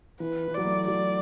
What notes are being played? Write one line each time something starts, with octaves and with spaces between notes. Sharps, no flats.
E3 B4
E3
F#3 D5
A3
F#3 D5